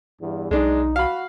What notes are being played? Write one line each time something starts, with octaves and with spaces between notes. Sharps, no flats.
E2 G2
B1 G#3 D4 D#4
F#4 F5 B5